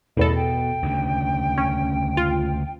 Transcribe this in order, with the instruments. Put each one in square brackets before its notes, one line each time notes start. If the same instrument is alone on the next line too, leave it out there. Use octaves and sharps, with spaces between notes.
[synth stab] A1 E2 A4 [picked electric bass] B2 [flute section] D#5 B5
[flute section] G5
[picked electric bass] D2 C#3
[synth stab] C#4
F4